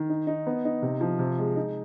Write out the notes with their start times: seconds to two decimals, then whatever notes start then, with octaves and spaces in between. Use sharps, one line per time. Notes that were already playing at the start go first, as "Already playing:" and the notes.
Already playing: D#3
0.10 D#4
0.27 D#4
0.47 B3
0.65 D#4
0.82 C3
1.01 F3
1.19 C3
1.38 G#3
1.56 D#4